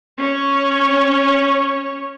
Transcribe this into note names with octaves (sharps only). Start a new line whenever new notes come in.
C#4 C#5